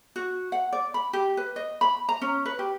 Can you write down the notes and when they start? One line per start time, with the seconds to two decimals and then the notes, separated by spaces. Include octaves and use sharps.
0.16 F#4
0.52 F#5
0.73 D5
0.94 B5
1.13 G4
1.37 B4
1.56 D#5
1.81 B5
2.09 A#5
2.22 C#4
2.46 B4
2.59 G4